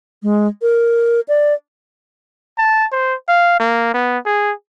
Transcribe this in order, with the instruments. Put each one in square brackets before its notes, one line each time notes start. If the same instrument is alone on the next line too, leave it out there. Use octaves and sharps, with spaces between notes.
[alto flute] G#3
A#4
D5
[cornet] A5
C5
F5
A#3
B3
G#4